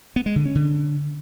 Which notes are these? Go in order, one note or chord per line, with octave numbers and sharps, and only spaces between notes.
B3
G#3
D3
C#4
D3